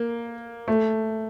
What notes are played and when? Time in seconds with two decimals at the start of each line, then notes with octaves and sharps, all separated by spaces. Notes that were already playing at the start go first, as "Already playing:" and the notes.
Already playing: A#3
0.68 A3